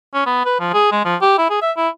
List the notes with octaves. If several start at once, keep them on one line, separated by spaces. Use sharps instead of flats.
C#4
B3
B4
F3
G#4
G#3
F3
G4
E4
G#4
E5
E4